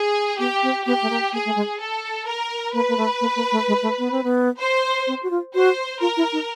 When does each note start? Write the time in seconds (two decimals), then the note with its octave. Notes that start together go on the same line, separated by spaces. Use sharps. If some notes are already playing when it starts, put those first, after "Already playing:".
Already playing: G#4
0.39 B3 G4
0.63 C4
0.86 B3 G4
1.02 A3
1.10 A#3
1.33 A#3 G#4
1.45 A3
1.56 G#3
1.80 A4
2.27 A#4
2.73 A#3 B4
2.89 A#3
2.97 A3
3.21 A#3
3.36 A#3
3.52 A3
3.68 G#3
3.83 A3
3.99 B3
4.12 C4
4.24 B3
4.60 C5
5.07 C4
5.23 F#4
5.31 F4
5.54 F#4 C5
6.01 F4 A#4
6.17 E4
6.33 D#4